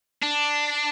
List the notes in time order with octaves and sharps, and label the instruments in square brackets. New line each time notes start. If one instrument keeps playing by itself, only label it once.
[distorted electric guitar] D4